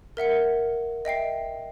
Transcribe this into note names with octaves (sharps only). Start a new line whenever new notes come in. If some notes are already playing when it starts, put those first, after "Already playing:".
A#4 E5 F#5 C#7
D#5 E5 G5 C7